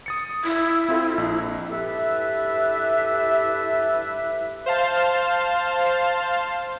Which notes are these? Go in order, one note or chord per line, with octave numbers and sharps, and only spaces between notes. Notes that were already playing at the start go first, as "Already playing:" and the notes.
D#6 A6 C#7
E4
C4 F4 A4
A#1 D#5
G2 E4 G4 A4 B4 E5
C5 F5 A5